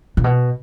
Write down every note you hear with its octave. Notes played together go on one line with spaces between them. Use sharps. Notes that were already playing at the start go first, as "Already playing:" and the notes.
A#2
B2